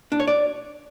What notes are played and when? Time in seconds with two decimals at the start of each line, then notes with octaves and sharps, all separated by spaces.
0.12 D4
0.20 C#5
0.28 D5